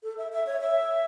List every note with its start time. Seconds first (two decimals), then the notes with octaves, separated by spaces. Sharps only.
0.03 A4
0.18 E5
0.32 E5
0.46 C#5
0.61 E5